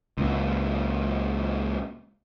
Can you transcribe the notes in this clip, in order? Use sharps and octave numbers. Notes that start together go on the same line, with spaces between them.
C#2 A#2